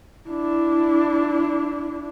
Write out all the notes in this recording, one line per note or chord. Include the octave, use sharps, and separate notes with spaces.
D4 E4